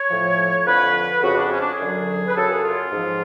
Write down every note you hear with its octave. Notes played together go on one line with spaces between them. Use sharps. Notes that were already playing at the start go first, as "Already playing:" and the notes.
Already playing: C#5
A2 F3
F2 D3 F3 B4
F2 C#3 F3 F#4
D4
C#4
D4
G#4
F#2 D3 F#3
B4
F#2 C#3 F#3 A4
G#4
F4
G#2 F3